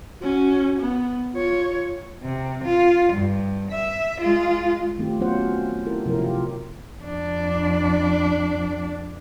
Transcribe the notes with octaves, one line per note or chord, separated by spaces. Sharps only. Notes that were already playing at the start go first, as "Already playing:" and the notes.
C#4 F#4
B3
F4 C#5
C3
F4
G2
E5
G#3 F4
D#3 A3 C4 F4 G4
F#3 B3 C#4 F4 C5 F#5
E4 G4 A4 A#4
C3 F3 F#3 E4 A#4
F4 G4
F2 D4